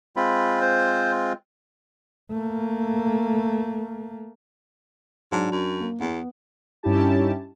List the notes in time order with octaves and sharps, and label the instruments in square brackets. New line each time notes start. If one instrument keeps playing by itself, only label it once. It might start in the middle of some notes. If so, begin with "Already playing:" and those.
[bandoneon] G#3 C4 F4 [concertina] B5
[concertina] C5
[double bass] A3 A#3
[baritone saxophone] G#2 [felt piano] F#3 D4 A5
[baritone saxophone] F#2
[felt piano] A#3
[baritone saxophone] E2 [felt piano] B3
[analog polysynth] G2 C#4 D#4 E4 G4 A5